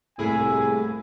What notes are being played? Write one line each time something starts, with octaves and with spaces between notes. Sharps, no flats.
C2 A2 A#3 E4 G#4 G#5